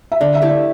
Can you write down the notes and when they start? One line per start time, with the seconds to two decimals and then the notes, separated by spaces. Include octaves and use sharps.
0.12 E5
0.20 D3 D5
0.35 E5
0.42 A3 E4 G4
0.49 D5